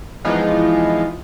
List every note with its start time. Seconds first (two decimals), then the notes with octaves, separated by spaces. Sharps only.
0.25 E3 F3 G#3 B3 D#4 F4